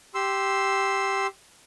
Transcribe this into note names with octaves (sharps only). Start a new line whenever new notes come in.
G4 C6 E6